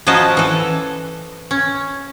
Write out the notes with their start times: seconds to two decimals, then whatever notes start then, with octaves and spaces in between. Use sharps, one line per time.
0.07 F3 C#4 D#4 F#4 D#5 A5
0.37 E3 A4
1.51 C#4